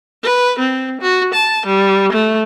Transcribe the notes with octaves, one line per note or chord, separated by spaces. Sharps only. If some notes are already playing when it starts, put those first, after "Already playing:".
B4
C4
F#4
A5
G3
A3